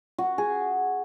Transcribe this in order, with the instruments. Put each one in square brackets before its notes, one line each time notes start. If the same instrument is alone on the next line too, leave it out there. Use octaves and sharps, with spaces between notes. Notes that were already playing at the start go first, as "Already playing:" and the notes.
[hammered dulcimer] F#4
G#4